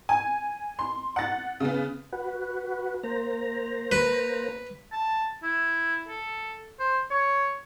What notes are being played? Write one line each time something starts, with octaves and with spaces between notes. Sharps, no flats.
G#5
C6
F#5 A6
C#3 B3
F#4 B4
A#3 C5 A#5
B4
A5
E4
A4
C5
C#5